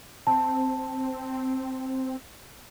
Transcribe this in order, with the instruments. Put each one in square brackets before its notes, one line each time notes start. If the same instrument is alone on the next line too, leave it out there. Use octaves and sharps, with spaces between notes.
[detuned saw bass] C4 [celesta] A5